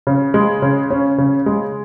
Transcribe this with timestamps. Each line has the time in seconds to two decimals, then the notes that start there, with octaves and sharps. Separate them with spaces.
0.07 C#3
0.34 G#3
0.62 C#3
0.90 C#4
1.18 C#3
1.46 G#3